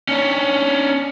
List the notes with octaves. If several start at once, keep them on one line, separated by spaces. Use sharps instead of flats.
C#4 D4